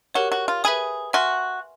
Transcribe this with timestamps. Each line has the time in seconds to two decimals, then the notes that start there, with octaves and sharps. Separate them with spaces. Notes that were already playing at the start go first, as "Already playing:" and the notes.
0.14 F#4 G4 A#4 C#5
0.32 F#4
0.48 F4
0.64 G#4 B4 E5 G#5 B5 D#6
1.13 F#4 E5 G#5 C6 F6